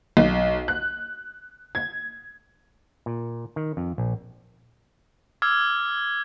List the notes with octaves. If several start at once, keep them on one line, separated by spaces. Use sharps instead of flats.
B1
F#6
G#6
A#2
D#3
F2
A#1
D6 E6 F6 G#6